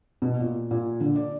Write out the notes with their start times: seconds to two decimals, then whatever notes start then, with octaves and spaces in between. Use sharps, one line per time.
0.22 B2
0.40 A#2
0.71 A#2
1.00 D3
1.16 D5